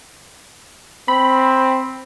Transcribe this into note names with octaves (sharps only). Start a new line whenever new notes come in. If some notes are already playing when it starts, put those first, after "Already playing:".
C4 B5